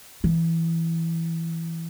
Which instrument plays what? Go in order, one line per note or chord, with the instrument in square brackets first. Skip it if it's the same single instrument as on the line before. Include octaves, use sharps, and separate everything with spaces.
[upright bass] E3